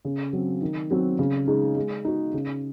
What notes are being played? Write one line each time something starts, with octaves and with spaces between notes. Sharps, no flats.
C#3
F#3 C4
D#3
F#3 C4 F#4
C#3
G#3 D#4 G#4
G#3
D#4 F#4
C#3